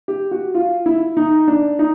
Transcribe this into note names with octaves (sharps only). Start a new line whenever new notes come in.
G4
F#4
F4
E4
D#4
D4
D#4